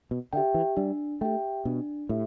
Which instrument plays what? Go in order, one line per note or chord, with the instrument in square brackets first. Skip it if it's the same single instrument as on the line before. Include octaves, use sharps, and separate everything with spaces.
[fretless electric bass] B2
[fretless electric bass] D3 [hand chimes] G4 E5 G5
[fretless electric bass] E3
[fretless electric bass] G3 [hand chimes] D4
[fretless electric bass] A3 [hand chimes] G4 E5 G5
[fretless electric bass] B2 [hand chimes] D4
[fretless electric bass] A2 [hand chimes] G4 E5